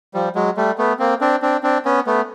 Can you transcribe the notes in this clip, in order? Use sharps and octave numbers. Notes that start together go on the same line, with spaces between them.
F3 G3
F#3 G#3
G3 A3
A3 B3
A#3 C4
C4 D4
C4 D4
C4 D4
B3 C#4
A3 B3